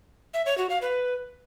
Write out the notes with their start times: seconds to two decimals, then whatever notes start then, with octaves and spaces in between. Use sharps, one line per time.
0.34 E5
0.46 C#5
0.58 F#4
0.70 F5
0.82 B4